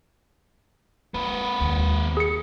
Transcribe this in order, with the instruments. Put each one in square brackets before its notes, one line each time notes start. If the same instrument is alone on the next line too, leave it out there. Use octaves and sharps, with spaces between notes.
[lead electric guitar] A#3 B4 [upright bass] C4
[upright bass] F#1 D#2
[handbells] G#4 C#7